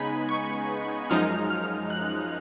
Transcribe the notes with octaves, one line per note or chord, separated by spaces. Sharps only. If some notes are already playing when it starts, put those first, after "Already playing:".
Already playing: C#3 G#3 B3 D#4 G#5 B5
C#6
F#2 F3 G#3 D#4 F6
F6
F#6